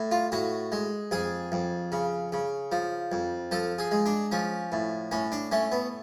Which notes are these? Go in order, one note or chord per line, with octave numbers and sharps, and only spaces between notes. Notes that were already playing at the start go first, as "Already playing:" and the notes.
Already playing: A2
F4
A2 F#4
G#3
F2 G#4
F2
C#3
C#3
F3
F2
F3 A4
G#4
G#3
D4
F3 C#4
A2
A2 C#4
D4
A3 C#4
B3